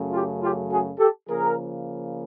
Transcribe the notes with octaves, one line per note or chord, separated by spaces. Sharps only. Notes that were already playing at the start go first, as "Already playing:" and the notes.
Already playing: F#2 C#3 F#3 A3
F4 G4
F4 G4
F#4 G#4
G4 A4
C#3 F3 A#3 G#4 A#4